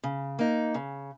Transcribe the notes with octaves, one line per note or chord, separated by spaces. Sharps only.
C#3
A#3 D#4
C#3